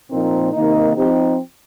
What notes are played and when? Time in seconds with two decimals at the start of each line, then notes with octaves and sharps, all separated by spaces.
0.10 A#2 F3 C4 D#4 A#4
0.53 C3 D#3 A#3 D#4
0.96 F3 C4 D#4 G4